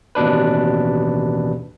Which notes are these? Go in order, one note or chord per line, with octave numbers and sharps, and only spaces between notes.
A1 D#2 B2 D4 B4